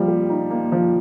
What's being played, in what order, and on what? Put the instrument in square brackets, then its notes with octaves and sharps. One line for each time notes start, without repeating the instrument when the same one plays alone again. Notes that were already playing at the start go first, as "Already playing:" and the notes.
Already playing: [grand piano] F3 A#3 [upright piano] G3
[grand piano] G4
D#4
A#3
F3